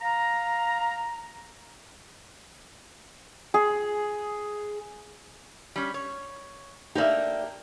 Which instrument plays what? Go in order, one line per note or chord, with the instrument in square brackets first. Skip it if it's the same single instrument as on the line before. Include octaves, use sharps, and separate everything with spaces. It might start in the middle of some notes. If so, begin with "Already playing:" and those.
[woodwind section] F5 A#5
[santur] G#4
[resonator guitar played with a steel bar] G3 C#4
C#5
[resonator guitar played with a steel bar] A#3 D4 D#4 [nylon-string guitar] G4 D5 E5